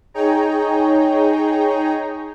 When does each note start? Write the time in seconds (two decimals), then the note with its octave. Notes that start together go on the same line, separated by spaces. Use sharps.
0.14 D#4 G#4 C#5 G5 A#5